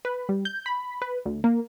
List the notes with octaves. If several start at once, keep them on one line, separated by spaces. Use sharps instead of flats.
B4
G3
G6
B5
B4
D2
A#3